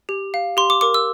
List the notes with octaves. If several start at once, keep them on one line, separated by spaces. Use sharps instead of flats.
G4
F5
G4 C6
D6
A#4 D6
E6